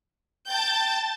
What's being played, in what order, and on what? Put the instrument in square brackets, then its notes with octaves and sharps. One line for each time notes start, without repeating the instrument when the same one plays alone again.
[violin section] G5 G6 [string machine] A5 A6